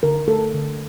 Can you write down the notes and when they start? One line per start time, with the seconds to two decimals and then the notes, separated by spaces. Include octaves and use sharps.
0.03 D3 A#4
0.28 A3 A4
0.54 D3